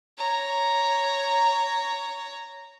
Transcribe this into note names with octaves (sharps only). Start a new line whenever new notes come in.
C#5 A#5